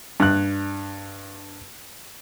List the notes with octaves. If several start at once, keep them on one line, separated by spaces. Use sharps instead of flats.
G2 F#6